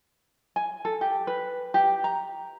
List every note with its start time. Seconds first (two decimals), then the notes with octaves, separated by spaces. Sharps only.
0.56 G#5
0.85 A4
1.01 G4
1.27 B4
1.74 G4
2.04 A#5